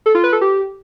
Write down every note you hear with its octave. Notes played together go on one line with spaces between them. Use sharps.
A4
F4
B4
A4
G4